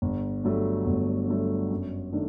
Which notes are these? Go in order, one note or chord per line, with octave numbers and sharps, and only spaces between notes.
G1
G2 F#3 A3
G1
G2 F#3 A3
F#2
D#3 A3 D4